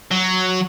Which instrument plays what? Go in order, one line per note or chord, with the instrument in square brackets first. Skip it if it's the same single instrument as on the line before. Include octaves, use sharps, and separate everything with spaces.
[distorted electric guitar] F#3